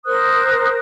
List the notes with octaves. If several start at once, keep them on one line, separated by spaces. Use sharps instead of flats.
A#4 C5 D#6 F#6